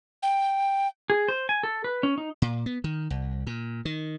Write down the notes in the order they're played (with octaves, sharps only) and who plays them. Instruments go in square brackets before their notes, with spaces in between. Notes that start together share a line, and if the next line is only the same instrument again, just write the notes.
[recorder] G5
[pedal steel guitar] G#4
C5
G#5
A4
B4
C#4
D#4
[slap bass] A#2
B3
D#3
C2
A#2
D#3